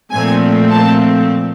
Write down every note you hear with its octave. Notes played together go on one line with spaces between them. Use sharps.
A#2 F3 A3 C4 G#5
A5